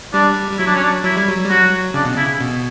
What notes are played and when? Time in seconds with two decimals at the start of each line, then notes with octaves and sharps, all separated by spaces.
0.13 G3 D4
0.51 G3
0.59 F#3 E4
0.67 D4
0.75 C#4
0.83 D4
1.04 F#3 E4
1.17 G3
1.28 F#3
1.45 G3
1.50 F#3 F#4
1.94 C#3 D4
2.05 B2
2.16 C#3 E4
2.41 B2